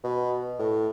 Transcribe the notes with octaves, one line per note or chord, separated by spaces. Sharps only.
B2
A2